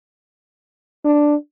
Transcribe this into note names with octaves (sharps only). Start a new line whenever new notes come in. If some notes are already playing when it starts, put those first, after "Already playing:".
D4